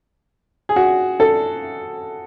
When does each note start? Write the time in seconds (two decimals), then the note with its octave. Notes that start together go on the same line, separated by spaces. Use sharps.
0.69 G#4
0.76 F#4
1.20 A4